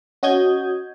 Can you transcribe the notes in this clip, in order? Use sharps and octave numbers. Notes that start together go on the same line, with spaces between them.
C#4 F#4 D#5 D#6 G6 G#6